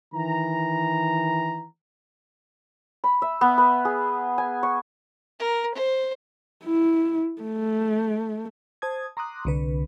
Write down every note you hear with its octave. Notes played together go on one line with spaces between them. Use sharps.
D#3 E3 A#5
B5
E5
B3
B4
G#4
G#5
C#6
A#4
C5
E4
A3
C5 A5 D#6 G#6
A#5 C6 D6 D#6 F#6
C2 D3 B4